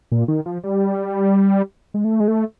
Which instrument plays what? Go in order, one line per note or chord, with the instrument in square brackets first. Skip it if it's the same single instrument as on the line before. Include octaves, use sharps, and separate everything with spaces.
[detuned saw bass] A#2
D#3
F3
G3
G#3
A3
G#3
A3